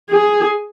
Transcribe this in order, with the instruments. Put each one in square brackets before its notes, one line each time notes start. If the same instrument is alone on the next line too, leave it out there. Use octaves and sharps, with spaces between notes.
[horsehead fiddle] G#4